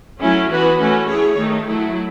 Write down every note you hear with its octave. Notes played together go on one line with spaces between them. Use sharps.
F#3 A3 C#4 E4
E3 B3 F#4 B4
E3 A3 C#4 F#4
A3 E4 G#4 C#5
D#3 A3 D#4
F#3 A3 E4